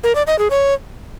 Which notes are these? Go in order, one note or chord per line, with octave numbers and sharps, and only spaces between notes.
A#4
D5
D#5
G#4
C#5